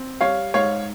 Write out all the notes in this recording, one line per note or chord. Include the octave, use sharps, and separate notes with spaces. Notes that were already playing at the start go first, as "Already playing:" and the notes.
Already playing: C4
G3 C#5 F5
G#2 C#5 F5